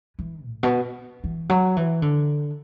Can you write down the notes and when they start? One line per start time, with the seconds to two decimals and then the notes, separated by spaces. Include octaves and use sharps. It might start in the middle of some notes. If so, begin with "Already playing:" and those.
0.19 E3
0.45 A2
0.63 B2
1.24 E3
1.49 F#3
1.77 E3
2.02 D3